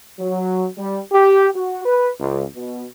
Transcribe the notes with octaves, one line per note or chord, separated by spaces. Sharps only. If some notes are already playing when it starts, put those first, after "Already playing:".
F#3
G3
G4
F#4
B4
C#2
B2